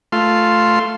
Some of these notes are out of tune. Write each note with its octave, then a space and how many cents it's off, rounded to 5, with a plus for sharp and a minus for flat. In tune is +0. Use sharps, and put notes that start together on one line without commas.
A3 +0 F4 +0 C6 +0